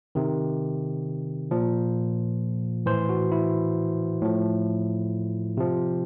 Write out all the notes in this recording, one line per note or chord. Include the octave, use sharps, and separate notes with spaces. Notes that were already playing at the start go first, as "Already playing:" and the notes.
C3 D#3
A#2 F3
A2 E3 C5
F#4
E4
A2 F3
C3 F3